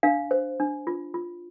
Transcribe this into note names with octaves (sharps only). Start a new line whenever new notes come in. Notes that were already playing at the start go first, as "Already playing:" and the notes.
D4 F5
C5
D4
F4
F4